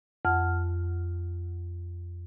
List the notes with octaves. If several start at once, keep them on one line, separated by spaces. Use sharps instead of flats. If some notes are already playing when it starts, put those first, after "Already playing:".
F2 F#5 F6